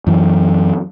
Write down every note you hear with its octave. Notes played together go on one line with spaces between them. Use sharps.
F#2 E3